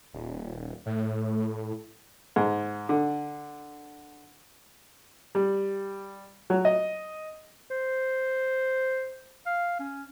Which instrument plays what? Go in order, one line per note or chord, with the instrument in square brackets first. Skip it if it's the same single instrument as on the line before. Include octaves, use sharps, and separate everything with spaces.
[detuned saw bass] D#1
A2
[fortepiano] G#2
D3
G3
F#3
D#5
[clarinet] C5
F5
C#4